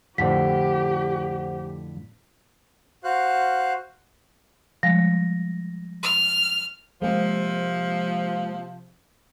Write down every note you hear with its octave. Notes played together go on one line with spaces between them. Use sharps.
F2 A2 D3 G4 C5 F#5 B6
F#4 C5 F5 F#6
F3 G3 G#3 A#6
F6
C3 F3 G#3 A#3 C4